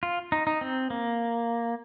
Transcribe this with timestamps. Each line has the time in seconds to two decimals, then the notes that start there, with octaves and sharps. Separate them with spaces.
0.03 F4
0.32 D#4
0.47 D#4
0.61 C4
0.90 A#3